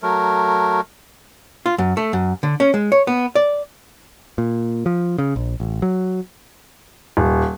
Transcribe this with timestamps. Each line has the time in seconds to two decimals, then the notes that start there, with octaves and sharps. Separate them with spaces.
0.02 F#3 A3 A#4
1.66 F4
1.78 F#2
1.97 A3
2.13 F#2
2.43 D3
2.60 C#4
2.74 G#3
2.92 C#5
3.07 B3
3.35 D5
4.38 A#2
4.86 F3
5.18 C#3
5.36 A#1
5.60 A1
5.82 F#3
7.17 D#1